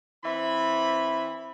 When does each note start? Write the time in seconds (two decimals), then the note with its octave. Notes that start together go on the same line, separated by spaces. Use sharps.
0.25 E3 C4 E5 B5